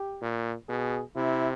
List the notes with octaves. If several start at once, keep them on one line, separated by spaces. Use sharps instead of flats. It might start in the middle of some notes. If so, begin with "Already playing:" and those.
Already playing: G4
A#2
B2 G#4
C3 E4